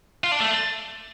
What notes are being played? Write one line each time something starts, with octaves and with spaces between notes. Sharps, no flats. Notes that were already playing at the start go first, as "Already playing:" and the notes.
F4
D4
A3